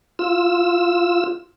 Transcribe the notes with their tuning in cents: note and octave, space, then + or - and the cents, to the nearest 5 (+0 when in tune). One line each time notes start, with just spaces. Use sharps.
F4 +0 E6 +0